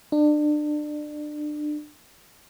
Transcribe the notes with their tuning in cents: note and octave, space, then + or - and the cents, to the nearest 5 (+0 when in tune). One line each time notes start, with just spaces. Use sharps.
D4 +30